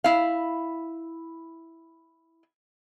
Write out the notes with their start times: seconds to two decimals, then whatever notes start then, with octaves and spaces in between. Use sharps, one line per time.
0.04 E4 F5